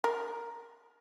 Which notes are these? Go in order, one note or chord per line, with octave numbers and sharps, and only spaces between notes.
A#4